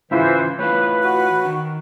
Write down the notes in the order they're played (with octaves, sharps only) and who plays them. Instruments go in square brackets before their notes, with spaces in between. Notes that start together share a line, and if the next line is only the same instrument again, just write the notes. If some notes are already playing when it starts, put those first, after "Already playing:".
[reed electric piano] G#2 E4 F4 [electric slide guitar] C#3 [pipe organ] E3 C5 E5
[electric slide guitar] A2 E3 F4 [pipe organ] B4 [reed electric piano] C#5
[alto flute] F#4
[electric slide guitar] D#3